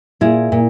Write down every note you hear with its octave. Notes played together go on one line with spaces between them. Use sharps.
A#2 E4 G#4
A#2